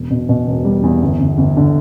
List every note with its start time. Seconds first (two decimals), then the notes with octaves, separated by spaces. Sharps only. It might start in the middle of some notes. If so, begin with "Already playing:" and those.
Already playing: E1
0.10 B2
0.29 B2
0.47 E1
0.65 G3
0.83 E2
1.02 G1
1.20 G1
1.38 G1
1.57 D3